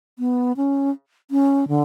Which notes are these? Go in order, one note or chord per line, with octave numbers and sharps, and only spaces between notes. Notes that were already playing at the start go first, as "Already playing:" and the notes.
B3
C#4
C#4
D3